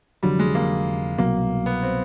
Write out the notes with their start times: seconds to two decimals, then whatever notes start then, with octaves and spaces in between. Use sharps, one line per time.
0.23 F1 F2 D3 F#3 G3
0.39 G#3
0.55 A#3
1.18 C2 B2 F#3 A#3
1.66 B3
1.83 C4